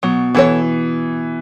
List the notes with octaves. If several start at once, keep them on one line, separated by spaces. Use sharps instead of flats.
B2 F#3
E3 B3 E4 A4 C#5